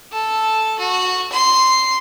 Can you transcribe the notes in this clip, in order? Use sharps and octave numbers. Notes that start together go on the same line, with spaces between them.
A4
F#4
C6